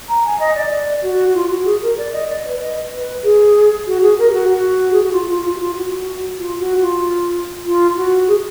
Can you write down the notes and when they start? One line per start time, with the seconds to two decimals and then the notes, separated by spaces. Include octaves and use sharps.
0.09 A#5
0.25 G#5
0.40 D#5
0.55 D5
0.71 D5
1.03 F#4
1.34 F4
1.51 F#4
1.65 G#4
1.82 A#4
1.97 D5
2.13 D#5
2.29 D5
2.45 B4
2.61 D#5
2.92 B4
3.23 G#4
3.87 F#4
4.02 G#4
4.18 A#4
4.30 G#4
4.34 F#4
4.49 F#4
4.93 G#4
5.03 F#4
5.12 F4
5.28 F4
5.45 F4
5.56 F#4
5.60 F4
5.76 F#4
6.38 F4
6.60 F#4
6.81 F4
7.65 F4
7.97 F#4
8.28 G#4